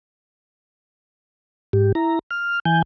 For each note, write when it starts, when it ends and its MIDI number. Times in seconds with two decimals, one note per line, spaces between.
1.73 1.92 44
1.73 1.92 67
1.95 2.19 64
1.95 2.19 82
2.31 2.60 89
2.65 2.82 52
2.65 2.82 80
2.65 2.82 91